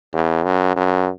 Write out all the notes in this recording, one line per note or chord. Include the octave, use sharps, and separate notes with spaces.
E2
F#2
F#2